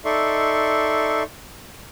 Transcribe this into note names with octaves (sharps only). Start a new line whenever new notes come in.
D#4 A4 D5 E5 C6 C#6